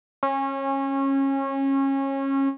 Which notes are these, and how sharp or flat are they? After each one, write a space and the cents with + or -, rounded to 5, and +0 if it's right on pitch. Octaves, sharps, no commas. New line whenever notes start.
C#4 -25